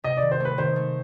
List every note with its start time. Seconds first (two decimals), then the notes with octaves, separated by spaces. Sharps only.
0.04 C3 D#5
0.17 D5
0.22 D#3
0.31 C5
0.40 A3 B4
0.58 D#3 C5
0.76 A3